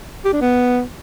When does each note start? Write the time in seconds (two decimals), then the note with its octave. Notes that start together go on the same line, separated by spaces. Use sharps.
0.25 G4
0.33 D4
0.41 B3